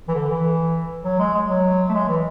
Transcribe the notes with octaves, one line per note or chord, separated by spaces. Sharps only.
E3
D3
E3
F#3
G#3
G#3
F#3
A3
G#3
E3